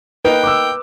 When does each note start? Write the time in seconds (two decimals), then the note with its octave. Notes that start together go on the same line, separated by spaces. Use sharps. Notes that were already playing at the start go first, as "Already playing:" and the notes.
0.25 A#3 D#4 B4 G5
0.44 D6 E6